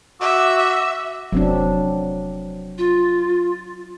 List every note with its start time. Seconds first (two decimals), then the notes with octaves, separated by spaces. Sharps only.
0.21 F#4 E5 D6 E6
1.32 F1 F#3 C4 D4
2.78 F4